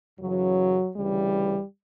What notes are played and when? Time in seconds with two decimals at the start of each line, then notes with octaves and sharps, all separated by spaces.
0.19 F#2 C#3 E3 F#3
0.95 D2 C#3 E3 G3